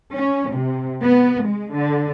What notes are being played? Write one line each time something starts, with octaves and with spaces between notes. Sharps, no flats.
C#4
C3
B3
G#3
D3